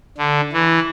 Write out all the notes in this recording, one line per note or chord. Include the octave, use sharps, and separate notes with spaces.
D3
E3